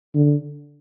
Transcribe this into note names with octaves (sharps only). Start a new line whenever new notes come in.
D3